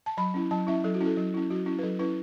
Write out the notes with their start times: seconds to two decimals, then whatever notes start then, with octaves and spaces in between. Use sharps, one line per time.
0.06 A5
0.17 F#3 B5
0.34 C#4 E4
0.51 F#3 A5
0.67 C#4 E4 E5
0.84 F#3 A4
0.95 F#4
1.01 C#4 E4
1.06 A4
1.17 F#3
1.34 C#4 E4
1.50 F#3 F#4
1.66 C#4 E4
1.79 B4
1.83 F#3 A4
2.00 C#4 E4 B4